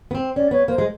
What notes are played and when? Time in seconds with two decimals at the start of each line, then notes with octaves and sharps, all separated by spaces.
0.11 B3
0.15 C4
0.36 C#4 D5
0.51 B3 C#5
0.67 A#3 C5
0.78 G#3